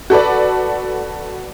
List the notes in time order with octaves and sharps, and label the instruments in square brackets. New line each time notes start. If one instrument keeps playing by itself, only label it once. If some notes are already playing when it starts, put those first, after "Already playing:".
[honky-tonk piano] F#4 A4 B4 D5